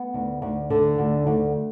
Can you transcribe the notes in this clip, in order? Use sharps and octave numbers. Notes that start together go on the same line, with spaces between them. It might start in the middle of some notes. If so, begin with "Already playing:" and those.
Already playing: B3
D2
D2
D3
D2
D2